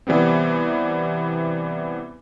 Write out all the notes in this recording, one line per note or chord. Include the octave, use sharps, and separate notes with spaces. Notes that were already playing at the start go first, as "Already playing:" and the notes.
C3 E3 G3 B3 C4